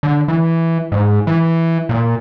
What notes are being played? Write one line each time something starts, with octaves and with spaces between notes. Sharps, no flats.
D3
E3
G#2
E3
A#2